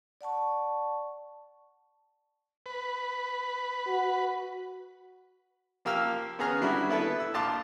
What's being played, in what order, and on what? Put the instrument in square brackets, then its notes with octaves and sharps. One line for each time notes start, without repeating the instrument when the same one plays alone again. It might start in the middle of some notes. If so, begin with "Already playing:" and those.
[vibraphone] D5 F#5 A5 C#6
[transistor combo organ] B4
[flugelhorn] F#4
[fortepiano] F3 A#3 G4 F5 E6 F6
B3 C#4 G#4 A#5 F6
D3 G3 E4 F#4
B3 E4 A4 B4
E6
A#1 F5 A5 C6 D6